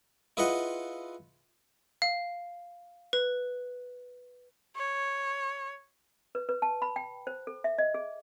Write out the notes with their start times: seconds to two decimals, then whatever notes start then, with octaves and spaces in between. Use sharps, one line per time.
0.37 E4 F4 G#4 B4 D#5 F#5
2.02 F5
3.13 B4
4.76 C#5
6.35 B4
6.49 B4
6.62 A5
6.82 B5
6.96 G5
7.27 C5
7.47 A4
7.64 E5
7.78 D#5
7.94 G#4